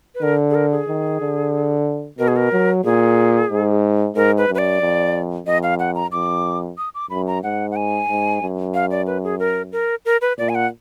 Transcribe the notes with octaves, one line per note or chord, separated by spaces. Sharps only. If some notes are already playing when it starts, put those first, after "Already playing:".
B4
D3 A#4
G#4
A#4
G#4
D#3
D3
B2 A#4
G#4
A#4
F#3
A#2 G#4
G#2
G#2 A#4
B4
F#2
B4
D5
F2
F2 D#5
F5
F#5
A#5
F2 D6
D#6
D6
F#2 B5
A#5
G#2 F#5
F#5
G#5
G#2
F#2
F5
D5
B4
G#4
A#4
A#4
A#4
B4
A#2 D5
G#5
F#5